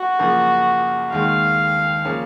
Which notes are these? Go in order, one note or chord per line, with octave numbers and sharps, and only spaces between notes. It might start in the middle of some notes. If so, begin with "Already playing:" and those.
Already playing: F#4
F#2 C#3 F3 A#3
D#2 D#3 G#3 F5
C#3 F3 A#3 C#4